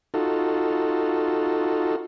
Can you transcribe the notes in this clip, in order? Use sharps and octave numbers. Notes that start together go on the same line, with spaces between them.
D#4 F4 F#4 A4